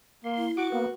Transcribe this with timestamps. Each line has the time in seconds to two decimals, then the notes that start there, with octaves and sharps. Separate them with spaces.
0.24 A#3 C6
0.38 E4
0.57 F#4 D6
0.72 A#3 B3 B4